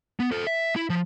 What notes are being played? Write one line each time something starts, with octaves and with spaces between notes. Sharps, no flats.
B3
A4 C5
E5
E4
F3